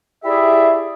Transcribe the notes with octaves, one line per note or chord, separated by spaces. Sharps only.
E4 G4 G#4 D5 E5